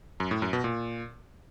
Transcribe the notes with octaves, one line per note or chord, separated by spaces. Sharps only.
F#2
A2
F#2
B2
A#2